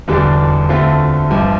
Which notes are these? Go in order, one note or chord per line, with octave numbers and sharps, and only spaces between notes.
E1 E2 D3 G3 D4
D2 D3 A3 C4 F4
G1 G2 F3